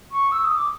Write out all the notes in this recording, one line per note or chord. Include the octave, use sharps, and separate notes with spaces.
C#6
E6
D#6
D6